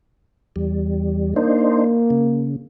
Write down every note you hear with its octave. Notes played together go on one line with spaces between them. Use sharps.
E2 G3
A#3 D4 D#4 C5
C#3